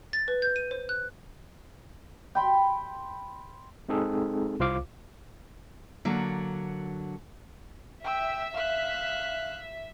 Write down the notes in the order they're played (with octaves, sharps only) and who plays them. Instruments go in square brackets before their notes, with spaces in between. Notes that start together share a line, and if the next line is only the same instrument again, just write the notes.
[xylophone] A6
B4
G6
D#7
C5
F#6
[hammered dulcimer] G5 B5 C6
[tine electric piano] G#3 C4 D#4 G#4 A4
C2 F4 C5 F5 D6
[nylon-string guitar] D3 F#3 A#3
[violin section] E5 [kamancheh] G5 E6
[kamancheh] F5 F#6